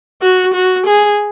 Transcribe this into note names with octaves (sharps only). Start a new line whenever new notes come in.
F#4
F#4
G#4